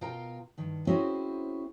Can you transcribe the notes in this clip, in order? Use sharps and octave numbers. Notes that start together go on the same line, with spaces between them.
B2 F4 A#4 F5 G5 A#5
G2 D#3
C4 C#4 E4 F#4 G#4 C5